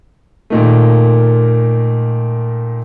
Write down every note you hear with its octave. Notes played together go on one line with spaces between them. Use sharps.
A#2 D#3 A3